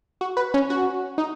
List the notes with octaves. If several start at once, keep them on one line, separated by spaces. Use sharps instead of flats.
F#4
B4
C#4
F#4
D#4